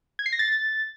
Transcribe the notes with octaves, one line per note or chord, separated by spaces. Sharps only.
G#6
C7
A#6
A6